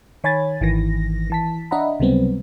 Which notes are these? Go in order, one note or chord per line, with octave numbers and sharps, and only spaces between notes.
D#3 C#5 G#5 B5 G#6 A6
G#1 D#3 E3 A#6
E3 A5 B6
D4 D#5 E5 F#5 A#5 B5
C#2 C3 F#3 G3 B3 C4